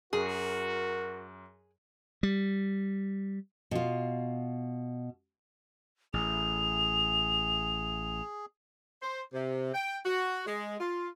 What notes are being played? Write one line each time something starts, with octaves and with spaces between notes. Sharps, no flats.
F#2 F#4 G#4 A#4
G3
B2 F4
A1 G#4 F7
C5
C3
G5
F#4
G#3
F4